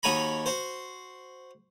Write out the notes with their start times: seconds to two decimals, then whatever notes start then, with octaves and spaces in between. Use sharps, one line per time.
0.03 D#2 D#4 F#4 G#5 A#5 B5
0.46 F#4 C5